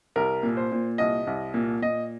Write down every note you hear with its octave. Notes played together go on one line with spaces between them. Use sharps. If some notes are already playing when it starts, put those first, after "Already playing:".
C2 A#4
A#2
C5
A#2
C2 D#5
C2
A#2
A#2 D#5